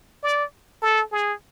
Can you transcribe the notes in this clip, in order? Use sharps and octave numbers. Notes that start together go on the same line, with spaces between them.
D5
A4
G#4